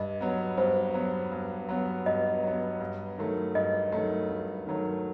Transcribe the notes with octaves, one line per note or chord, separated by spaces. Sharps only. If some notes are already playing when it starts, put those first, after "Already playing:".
Already playing: G2 D#5
F#3 B3
G2 C5
F#3 B3
G2
F#3 B3
G2 D#5
F#3 B3
G2
D#3 F#3 A3
G2 D#5
D#3 F#3 A3
G2
D#3 F#3 A3